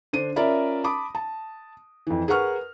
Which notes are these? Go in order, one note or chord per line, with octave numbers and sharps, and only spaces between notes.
D3 D4 C5 D#7
C#4 F4 A#4 D5 E5 B5
A5 B5 D6 D#6
A5
F2 E3
G#4 A#4 B4 F#5 C#6 F6